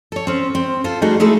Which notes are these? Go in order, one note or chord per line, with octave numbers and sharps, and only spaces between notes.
A4 C#5
C4 C#4
C4
F4 A4 C5
G3 A3 D#4 F#4 G#4
G#3 A3 D#4 E4 G#4 A4